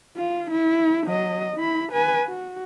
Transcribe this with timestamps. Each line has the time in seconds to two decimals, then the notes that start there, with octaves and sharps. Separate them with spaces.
0.17 F4
0.51 E4
1.07 F#3 D#5
1.57 E4 B5
1.92 B4 G#5
2.27 F#4